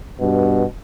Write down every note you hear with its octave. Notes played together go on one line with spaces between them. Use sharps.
G2 B2